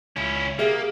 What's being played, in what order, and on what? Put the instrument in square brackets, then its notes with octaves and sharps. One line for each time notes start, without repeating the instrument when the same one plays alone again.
[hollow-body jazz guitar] C#2 [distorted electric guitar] C#4 E4
[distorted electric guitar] A#3 [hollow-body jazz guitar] G4 E5 [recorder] G#4